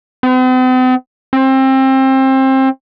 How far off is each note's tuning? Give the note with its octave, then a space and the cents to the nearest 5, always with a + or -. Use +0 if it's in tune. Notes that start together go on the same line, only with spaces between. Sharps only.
C4 -45
C4 +25